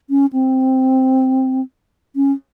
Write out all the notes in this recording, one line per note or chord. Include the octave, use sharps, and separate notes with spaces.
C#4
C4
C#4